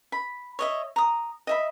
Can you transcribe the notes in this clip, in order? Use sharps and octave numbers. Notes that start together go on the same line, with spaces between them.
B5
C#5 D#5 E5
A#5 D#6
D#5 E5 B5